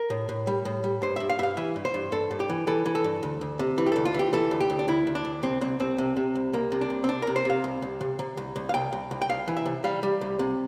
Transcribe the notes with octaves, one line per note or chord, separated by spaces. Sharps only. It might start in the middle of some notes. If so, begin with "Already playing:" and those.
Already playing: A#4
A2
A2
G3
A2
G3
G2 C5
G2 E5
F5
G2 E5 F5
E3 E5
G2
C5
G2
G2 A4
G2
G4
E3
E3 A4
E3
A4
G2
D2
D2
C3
E3
G4
D2 A4
F4
E3 G4
E3 A4
D2
G4
D2
D4
D2 E4
D2
D4
D2
C2 C4
C2 C4
C2 C4
C3
C3
C2
C2 A#3
C3
D4
C2
C4
C2 D4
C3 A#4
C5
C3 F5
C2
C2
C3
C3
C2
C2
F5
C2 G5
C2
C2
G5
C2 F5
E3
E5
C3
G3 F5
G3
C2
C3